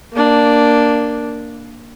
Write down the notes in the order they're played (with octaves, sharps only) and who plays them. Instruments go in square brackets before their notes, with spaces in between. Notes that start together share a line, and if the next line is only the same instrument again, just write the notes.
[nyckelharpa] A#3 D4